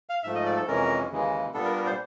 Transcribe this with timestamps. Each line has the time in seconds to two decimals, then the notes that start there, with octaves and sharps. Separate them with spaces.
0.09 F5
0.23 G#2 F3 A3 E5
0.35 D#5
0.46 D5
0.57 A4
0.67 F2 C3 E3 G#3 C#4 A#4
1.11 D#2 C#3 E3 G#3
1.54 A#2 G3 B3 D4 A4
1.64 A#4
1.76 A#4
1.86 C5